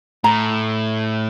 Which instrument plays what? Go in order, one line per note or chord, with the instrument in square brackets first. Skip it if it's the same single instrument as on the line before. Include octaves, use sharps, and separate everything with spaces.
[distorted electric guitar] A2 [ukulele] A#5